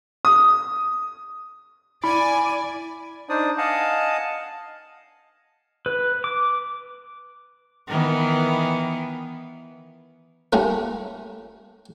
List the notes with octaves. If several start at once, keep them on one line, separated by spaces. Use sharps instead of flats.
D#6
E4 D5 G#5 B5
D4 D#4 C5 D5 D#6
D#5 F5 F#5 G#5 A5
B4
D6
D#3 E3 B3
G3 A3 C#4 F4 A#4